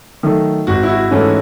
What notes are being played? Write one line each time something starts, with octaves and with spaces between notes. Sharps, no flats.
D#3 F#3 A3
G#1 F#4
E4
F#4
G#2 E3 A3 C#4